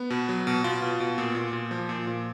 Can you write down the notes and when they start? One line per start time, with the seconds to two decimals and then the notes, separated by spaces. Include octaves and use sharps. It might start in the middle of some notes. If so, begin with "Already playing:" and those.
Already playing: B3
0.10 B2
0.29 F#3
0.47 B2
0.64 B2 F4
0.82 B2
1.00 B2
1.18 A#2
1.35 A#2
1.53 A#2
1.71 F3
1.89 A#2
2.07 A#2